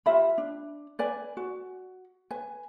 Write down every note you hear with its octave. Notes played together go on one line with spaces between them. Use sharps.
F4 G4 E5 B5
D4
B4 D5 G#5
F#4
B4 G#5